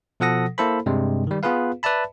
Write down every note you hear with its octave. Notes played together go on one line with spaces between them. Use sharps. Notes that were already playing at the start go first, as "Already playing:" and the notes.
B2 F3 A4 F#5 D#6 A#6
A#3 E4 A4 C5 B5
G2 C3 G3 G#3
D#3 G3
B3 F4 G#4 B4 F5
B4 D5 E5 A5 B5